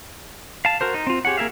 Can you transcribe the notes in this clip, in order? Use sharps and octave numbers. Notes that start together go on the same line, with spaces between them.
F5 A5
F#4 A#4 C5
D#4
C4 F4
G4 G#4 C#5 F#5
A#3 G#4 A#4 E5 F5